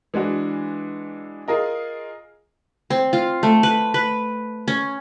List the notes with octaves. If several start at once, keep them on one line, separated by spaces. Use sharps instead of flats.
E3 G#3 D4 F#4
F4 G#4 A#4 D#5
C4
F4
A3
B4
B4
C#4